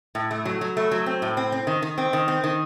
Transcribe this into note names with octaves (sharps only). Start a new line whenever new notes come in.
A2
A3
F#3
F#3
A3
F#3
C4
A2
C4
C4
D#3
D#3
C4
D#3
C4
D#3